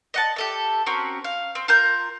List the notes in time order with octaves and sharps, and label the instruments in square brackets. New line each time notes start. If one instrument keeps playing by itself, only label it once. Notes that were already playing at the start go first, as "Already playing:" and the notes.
[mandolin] D#5 F#5 A5
G4 A4 E5
C4 C#4 F#4 A#4
F5
C4
F4 A#4 G6